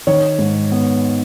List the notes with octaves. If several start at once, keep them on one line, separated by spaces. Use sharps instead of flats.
D#3 C#5
G#2
B3